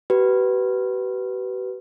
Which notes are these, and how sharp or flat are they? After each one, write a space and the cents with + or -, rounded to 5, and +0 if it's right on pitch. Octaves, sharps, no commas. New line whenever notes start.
G4 -45 B4 +0